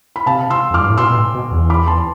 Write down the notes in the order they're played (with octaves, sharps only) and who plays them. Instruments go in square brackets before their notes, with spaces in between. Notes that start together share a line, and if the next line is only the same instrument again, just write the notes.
[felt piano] B5
[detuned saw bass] C3 [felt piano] F5 A5
[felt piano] C6 E6
[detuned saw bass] F2 [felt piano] D6 F6
[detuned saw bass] G2
A2
[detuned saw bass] B2 [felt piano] C6 E6
[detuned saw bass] B2
A2
B2
E2
[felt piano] B5 D6
A5 C6